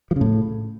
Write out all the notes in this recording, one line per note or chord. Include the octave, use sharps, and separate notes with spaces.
F3
C#3
A2